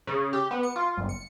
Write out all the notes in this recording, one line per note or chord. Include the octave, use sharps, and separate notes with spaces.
C#3
G4
B3
C#7
F4
G1
C#7